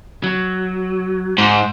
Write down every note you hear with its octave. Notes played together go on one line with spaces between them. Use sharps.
F#3
G#2 C5